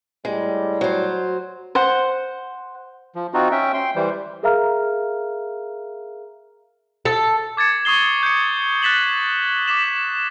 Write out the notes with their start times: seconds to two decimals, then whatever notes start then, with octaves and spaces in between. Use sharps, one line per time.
0.25 A2 G3 G#3
0.81 F#3 C5
1.75 C5 F#5
3.15 F3
3.34 C4 D#4 F4 F#4
3.52 C#4 E5 G5
3.74 G5 C6
3.96 E3 G3 C5
4.43 G#4 A#4 E5 F5 A#5 F6
7.05 A4
7.57 D6 G#6 A6 C#7
7.85 C#6 D#6 C7 G7
8.23 G6 C#7
8.82 F#6 A6 B6 E7 F#7
9.66 D6 B6 E7 F#7